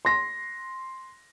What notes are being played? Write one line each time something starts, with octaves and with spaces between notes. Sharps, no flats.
C6 A#6